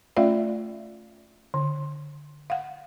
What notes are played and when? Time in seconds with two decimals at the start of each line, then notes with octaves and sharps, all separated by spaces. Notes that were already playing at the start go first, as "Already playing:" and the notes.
0.17 A3 C#4 F4 D5 E5 F5
1.54 D3
2.50 F5 F#5